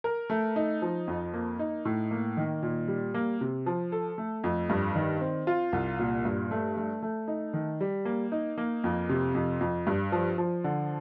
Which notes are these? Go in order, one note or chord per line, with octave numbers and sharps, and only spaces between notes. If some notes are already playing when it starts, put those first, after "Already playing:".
A#4
A3
D#4
F3
F2
A#3
D#4
A2
A#3
D#3
A#2
G3
A#3
C3
F3
A4
A3
F2
G2
D#3
C4
F4
C2
A#2
G2
A3
A3
A3
D#4
D#3
G3
A#3
D#4
A#3
F2
C3
F2
F2
G2
F3
F3
D3